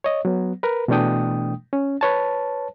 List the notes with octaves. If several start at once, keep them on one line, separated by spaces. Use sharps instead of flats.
C#5 D#5
F#3 B3
A#4 B4
B2 E3 A3 D4 G5 D#6
C#4
B4 C#5 A5